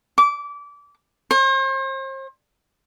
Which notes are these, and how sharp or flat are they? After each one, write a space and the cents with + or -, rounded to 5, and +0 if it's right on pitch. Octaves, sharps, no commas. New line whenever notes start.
D6 -25
C5 +40